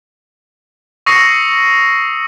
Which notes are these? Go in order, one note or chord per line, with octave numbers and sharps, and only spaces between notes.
C#6 D#6 E6 A#6 C7 C#7